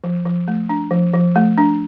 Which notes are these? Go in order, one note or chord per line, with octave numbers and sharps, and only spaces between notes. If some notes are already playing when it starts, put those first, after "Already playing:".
F3
F3
A3
D4
F3
F3
A3
D4